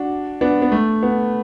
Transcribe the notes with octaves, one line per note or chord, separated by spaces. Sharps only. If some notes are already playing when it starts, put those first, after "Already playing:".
Already playing: D4 F#4
B3 D4
B3
A3
B3